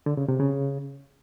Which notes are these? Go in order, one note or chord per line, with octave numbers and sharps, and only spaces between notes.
D3
C#3
C3
C#3